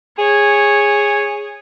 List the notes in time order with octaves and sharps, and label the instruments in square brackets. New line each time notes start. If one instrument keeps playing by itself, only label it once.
[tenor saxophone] G#4 [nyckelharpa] C#5